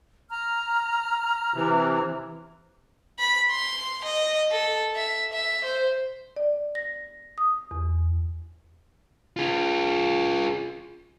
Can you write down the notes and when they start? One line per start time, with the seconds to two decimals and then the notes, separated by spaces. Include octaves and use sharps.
0.29 A#5 F6
1.54 C3 E3
3.19 B5
3.51 C6
4.04 D#5
4.51 A4
4.96 E5
5.33 E5
5.64 C5
6.36 D5
6.75 A#6
7.38 D#6
7.71 E2
9.37 F4 G#4